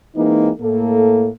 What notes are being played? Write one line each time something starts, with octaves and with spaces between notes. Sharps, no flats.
E3 G#3 A#3 C4 D#4
A2 A#3 A4